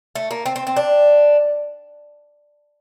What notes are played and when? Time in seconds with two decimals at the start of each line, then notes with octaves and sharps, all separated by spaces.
0.15 A3
0.31 A#3
0.46 C4
0.56 C4
0.67 C4
0.76 D4